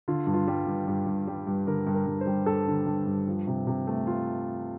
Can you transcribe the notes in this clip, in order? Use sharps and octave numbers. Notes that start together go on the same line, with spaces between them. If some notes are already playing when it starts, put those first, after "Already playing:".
D3 F4
G2
F4
G3
G2
G2
G2
G3
G2
D3 A#4
G2
A#4
G2
C5
G3
G2 A4
D3
G2
G2
F3
C3
C3
A3
F4